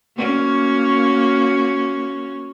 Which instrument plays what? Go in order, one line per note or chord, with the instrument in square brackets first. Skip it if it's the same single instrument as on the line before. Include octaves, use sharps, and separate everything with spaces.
[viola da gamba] A#3 C#4 F#4